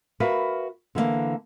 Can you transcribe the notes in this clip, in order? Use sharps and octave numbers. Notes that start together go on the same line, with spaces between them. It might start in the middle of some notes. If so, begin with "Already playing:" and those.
F#4 A#4 B4 E5 F5
D3 E3 G#3 A#3